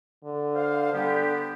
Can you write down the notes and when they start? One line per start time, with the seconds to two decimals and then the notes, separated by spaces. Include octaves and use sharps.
0.25 D3
0.55 C5 F5
0.94 D3 G3 B3 G4